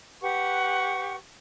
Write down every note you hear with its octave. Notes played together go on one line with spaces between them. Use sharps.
G4 B4 F#5 C#6